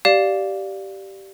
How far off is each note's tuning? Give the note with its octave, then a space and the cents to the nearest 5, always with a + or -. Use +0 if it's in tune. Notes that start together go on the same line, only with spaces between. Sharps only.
G4 -15 D5 +0 F5 +0